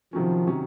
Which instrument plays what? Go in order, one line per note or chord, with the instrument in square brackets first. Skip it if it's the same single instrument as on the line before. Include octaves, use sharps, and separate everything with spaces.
[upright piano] C3 D#3 F#3 C#4 [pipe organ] F3
[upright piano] C3 D#3 F#3 C#4